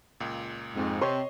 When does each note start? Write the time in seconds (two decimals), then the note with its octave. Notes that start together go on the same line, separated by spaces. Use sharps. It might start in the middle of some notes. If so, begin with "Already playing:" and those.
0.20 C#2 A#2
0.75 F2 G#2
1.01 C3 C#5 D#5 C6